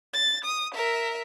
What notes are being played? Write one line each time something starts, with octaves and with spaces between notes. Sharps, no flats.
A6
D#6
A#4 E5